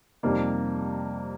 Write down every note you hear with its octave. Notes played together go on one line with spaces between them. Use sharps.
F2 C3 G3 A#3 D#4